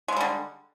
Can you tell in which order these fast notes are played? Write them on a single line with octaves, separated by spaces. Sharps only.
G#3 E3 G3 D3